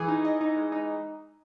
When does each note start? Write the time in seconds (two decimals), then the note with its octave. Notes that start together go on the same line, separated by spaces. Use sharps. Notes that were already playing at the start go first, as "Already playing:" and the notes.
Already playing: E3 G#4
0.08 D#4
0.25 D#5
0.41 D#4
0.56 G#3
0.72 D#4